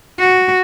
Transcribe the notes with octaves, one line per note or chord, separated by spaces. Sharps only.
F#4